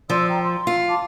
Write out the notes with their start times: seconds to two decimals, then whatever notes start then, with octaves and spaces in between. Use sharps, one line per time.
0.10 F3 D5 C6 E6
0.29 G5 A#5
0.43 C6
0.67 F4
0.88 A5 D6